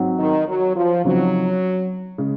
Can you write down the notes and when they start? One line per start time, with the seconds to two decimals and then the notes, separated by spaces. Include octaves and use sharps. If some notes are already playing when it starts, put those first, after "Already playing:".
Already playing: G#2 F#3 C4 F#4
0.19 D#3
0.47 F#3
0.76 F3
1.04 C#3 F3 F#3 C4 D#4
2.18 C#3 G#3